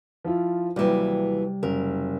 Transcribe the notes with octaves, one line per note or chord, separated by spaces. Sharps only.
F3 E4 F4
D#2 C3 E3 F#3 G3
F#1 A#4